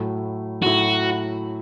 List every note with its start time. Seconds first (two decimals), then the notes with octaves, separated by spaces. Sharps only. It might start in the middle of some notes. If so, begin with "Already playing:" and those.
Already playing: A2 F#3 A3 E4
0.62 A2 F#3 A3 E4 F#4